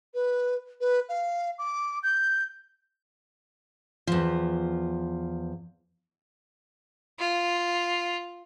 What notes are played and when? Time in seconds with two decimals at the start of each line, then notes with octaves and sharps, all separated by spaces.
0.14 B4
0.81 B4
1.09 F5
1.59 D6
2.03 G6
4.07 E2 F3
7.19 F4